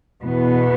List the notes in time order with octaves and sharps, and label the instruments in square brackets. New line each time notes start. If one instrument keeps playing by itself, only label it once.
[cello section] E2 B2 B3